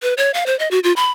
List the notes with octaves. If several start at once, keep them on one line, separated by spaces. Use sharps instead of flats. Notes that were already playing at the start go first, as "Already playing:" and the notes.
B4
C#5
F5
C5
D#5
F#4
F4
B5